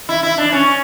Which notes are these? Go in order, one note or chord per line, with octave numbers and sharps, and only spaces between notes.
E4
E4
D4
C#4